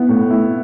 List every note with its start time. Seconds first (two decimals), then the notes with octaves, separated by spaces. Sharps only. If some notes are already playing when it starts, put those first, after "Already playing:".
Already playing: B3 E4
0.09 A2
0.30 E4